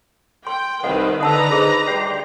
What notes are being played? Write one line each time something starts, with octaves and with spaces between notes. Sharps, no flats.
G5 C6
C2 D#3 C4 B4 D#5 F#5
D3 B4 F#5 A5 A#5 E6
D#4 G#4 C5 D#5
D2 G3 D5 G5 C6